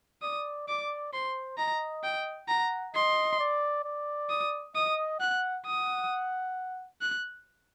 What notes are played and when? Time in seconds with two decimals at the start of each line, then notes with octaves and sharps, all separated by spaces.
0.22 D5 D#6
0.68 D5 D6
1.13 C5 C6
1.57 D#5 A#5
2.03 G5
2.48 F#5 A#5
2.94 D#5 C6
3.40 D5
3.85 D5
4.30 D#6
4.75 D#5 D#6
5.20 F#5 F#6
5.66 F#5 D#6
7.01 F#6